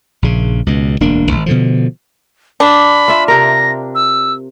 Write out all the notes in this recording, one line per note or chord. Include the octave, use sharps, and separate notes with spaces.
A#1 C#3
C#2 B2
E1 D2 A#3 D4
G#1
B2 D3 F3
D4 B5
F4 E5
C3 A#4 A#6
E6